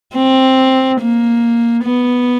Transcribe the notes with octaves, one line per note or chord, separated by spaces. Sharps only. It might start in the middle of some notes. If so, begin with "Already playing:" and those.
C4
A#3
B3